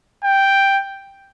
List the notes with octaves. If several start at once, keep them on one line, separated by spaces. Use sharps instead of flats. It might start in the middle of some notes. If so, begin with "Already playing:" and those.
G5